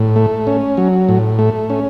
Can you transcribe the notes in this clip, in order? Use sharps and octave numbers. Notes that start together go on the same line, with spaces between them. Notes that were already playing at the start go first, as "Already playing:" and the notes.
Already playing: A2
A3
C#4
F#3
A2
A3
C#4